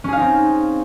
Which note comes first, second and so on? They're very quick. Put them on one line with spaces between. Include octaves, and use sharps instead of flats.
C#4 G#4 F5 D#4 C4